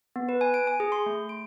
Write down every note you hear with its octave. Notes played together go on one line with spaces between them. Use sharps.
B3
B4
G#5
D7
G#5
G#4
C6
A3
D7